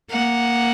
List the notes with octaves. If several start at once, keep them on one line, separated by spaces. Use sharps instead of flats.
A#3 F#5